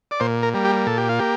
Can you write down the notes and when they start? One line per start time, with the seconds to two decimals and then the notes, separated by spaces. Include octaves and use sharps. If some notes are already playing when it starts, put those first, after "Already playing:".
0.11 D5
0.20 A#2 C5
0.43 A#4
0.54 G3 A#3
0.65 G4
0.87 A#2 A4
0.98 G4
1.09 F4
1.19 A#3 G4